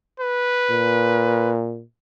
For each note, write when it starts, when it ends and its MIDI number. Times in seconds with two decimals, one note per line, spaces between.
0.20 1.52 71
0.70 1.83 46